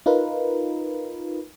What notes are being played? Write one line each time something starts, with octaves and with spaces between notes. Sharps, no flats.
D#4 F4 A#4 B4